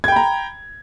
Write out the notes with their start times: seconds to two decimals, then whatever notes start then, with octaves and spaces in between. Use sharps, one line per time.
0.04 G#6
0.08 G5
0.12 B5
0.16 A#5